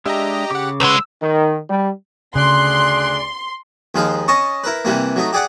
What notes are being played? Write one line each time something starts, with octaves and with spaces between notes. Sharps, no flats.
G#3 D4 G4 D#5 E5 A#5
C#3 G4 F#5 D6
C2 G#3 B4 C#5 F#5 E6
D#3
G3
D2 C#3 G#4 D5 C6 F#6
D#2 F3 G#3 D#4 F5
C#4 D#5 A5 C#6
E4 A#4 B4
C3 E3 G3 A#3
F#3 A3 D#4
G4 G#4 D5 F#5